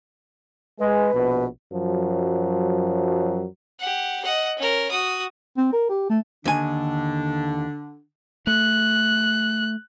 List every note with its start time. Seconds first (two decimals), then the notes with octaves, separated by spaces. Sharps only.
0.79 G#3 B4
1.13 A#1 B2
1.73 F#2 F3 F#3
3.80 G4 F#5
4.23 D#5 F#5
4.59 C#4 A#4
4.91 F#4 D#6
5.57 C4
5.73 A#4
5.90 G4
6.10 A3
6.45 D#2 D3 D4 G#5
8.47 A3 F#6